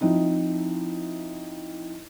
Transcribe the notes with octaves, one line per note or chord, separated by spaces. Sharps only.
F3 C4 D#4 E4